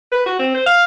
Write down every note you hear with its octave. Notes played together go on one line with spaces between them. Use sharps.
B4
F#4
C4
C5
F5